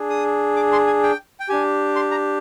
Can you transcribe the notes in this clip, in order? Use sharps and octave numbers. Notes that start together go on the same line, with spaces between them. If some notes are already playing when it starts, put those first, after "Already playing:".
Already playing: D4 G#4
D#6
D6
C6
G#5
G5
G5
D4 G4 G#5
C6
A#5